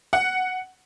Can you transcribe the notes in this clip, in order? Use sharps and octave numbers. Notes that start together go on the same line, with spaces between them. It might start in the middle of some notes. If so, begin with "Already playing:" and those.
F#5